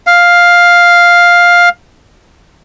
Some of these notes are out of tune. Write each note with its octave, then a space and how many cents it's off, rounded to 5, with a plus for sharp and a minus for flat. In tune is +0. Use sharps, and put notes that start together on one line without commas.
F5 +5